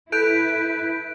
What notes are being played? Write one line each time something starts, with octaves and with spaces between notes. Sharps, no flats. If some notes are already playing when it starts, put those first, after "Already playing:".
E4 A4 B4 F#6 G6 D7